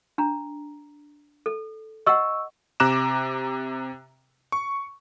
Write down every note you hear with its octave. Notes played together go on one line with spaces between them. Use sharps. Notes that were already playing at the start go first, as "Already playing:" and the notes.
D4 A#5
A4
D#5 F#5 C#6 E6
C3 A#5 D6 F#6 E7
C#6